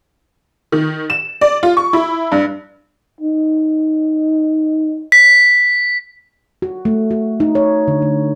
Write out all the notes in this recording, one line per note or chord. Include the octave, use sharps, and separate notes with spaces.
D#3
E7
D5
F4
C#6
E4
G2
D#4
B6
F#4
A3
F#4
D#4
C#5
D3
A3